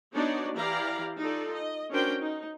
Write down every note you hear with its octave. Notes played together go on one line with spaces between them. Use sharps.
B3 D4 D#4 F#4 C#5 D5
E3 E4 G4 D5 F5 A#5
D#4 F4 A4 D5
D#5
C#4 D4 F#4 A#4 C5 G5
D#4